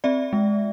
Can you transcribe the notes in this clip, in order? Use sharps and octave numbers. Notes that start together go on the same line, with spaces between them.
C4 D5 E5
G#3